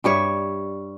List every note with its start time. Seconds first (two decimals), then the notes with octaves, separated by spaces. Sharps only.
0.04 G2 G3 C#5 E5